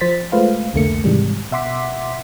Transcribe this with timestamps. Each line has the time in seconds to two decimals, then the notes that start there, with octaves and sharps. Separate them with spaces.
0.01 F3 C5 A6 B6
0.32 G#3 A3 F4 B4 C5 F5
0.73 C2 F2 D3 A3 A#3 C#7
1.04 G#2 C3 D#3 E3 G3 G#3
1.52 B2 E5 F#5 C6 D6 B6